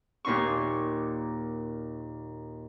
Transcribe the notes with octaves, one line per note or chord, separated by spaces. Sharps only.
D#2 A#2 D#4 C6 C#6